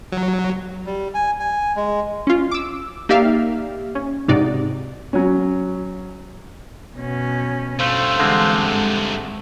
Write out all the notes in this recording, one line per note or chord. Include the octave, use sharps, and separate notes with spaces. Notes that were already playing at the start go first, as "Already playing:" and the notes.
F#3
G3
G#5
G#5
G#3
C#4 F4
D6 E6
A#3 D#4 G4 D5 E5 F5
C#4
G#2 C3 D#4 F#4 D5
F#3 C#4
B2 C#4
G2 A3 C5 F5 E6
D3 E3 G#3 C4
G#2 A4